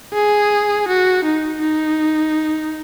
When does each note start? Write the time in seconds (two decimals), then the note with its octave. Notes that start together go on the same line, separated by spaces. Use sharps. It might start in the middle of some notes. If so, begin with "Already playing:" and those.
0.14 G#4
0.88 F#4
1.25 D#4
1.62 D#4